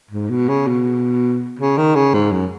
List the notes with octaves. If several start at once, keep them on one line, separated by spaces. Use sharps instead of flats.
G#2
B2
C#3
B2
C#3
D#3
C#3
G#2
F#2